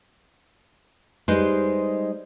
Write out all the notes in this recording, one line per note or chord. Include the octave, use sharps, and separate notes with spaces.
G3 G#3 D#4 B4 C5